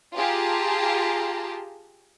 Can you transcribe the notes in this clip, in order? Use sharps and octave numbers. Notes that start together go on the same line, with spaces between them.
F4 G4 G#4 A5 A#5